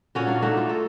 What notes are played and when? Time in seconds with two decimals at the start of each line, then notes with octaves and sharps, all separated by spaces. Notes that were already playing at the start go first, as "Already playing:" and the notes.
0.15 A#2 C#4 F#4
0.26 A#3 D4 F5
0.42 A3 A#3 D#4 F#4
0.57 F4
0.69 A4